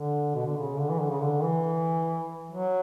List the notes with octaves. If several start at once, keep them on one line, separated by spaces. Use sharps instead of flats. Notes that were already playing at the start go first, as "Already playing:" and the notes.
Already playing: D3
B2
D3
C#3
D3
E3
D3
C#3
D3
E3
F#3